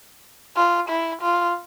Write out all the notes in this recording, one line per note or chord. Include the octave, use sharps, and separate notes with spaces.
F4
E4
F4